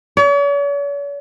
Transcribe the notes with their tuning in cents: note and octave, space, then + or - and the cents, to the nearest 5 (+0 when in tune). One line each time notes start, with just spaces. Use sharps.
C#5 +45